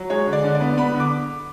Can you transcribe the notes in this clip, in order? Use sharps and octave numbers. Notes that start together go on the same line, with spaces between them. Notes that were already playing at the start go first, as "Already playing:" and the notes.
Already playing: F#3
G#3 C#5
D3
D5
D3
D5
B3
B3 B5
D3
D6